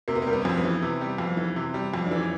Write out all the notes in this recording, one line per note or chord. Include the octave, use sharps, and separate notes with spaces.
C3 A#3
B3
G3 A#3
B3
C#4
F2 C4
B3
E3
C3
G3
F2
E3
C3
G3
F2
E3 D4
C#4